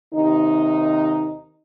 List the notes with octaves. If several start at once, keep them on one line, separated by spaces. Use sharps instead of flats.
D#2 C3 D#3 D#4